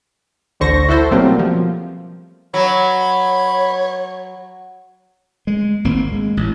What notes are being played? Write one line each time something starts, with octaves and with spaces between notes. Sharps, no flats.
A1 D2 D3 C5 C#6 A#6
E4 F#4 A4 C5
B2 F#3 G3 A3 A#3 C4
F3
F#3 C#5 B5
G#3
G#1 A#3 C4
G#3
A1